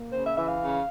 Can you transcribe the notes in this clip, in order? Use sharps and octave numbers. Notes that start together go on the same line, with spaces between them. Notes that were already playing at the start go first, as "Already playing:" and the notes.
Already playing: A#3
C#3 C5
E5
E3 E5
F5
C#3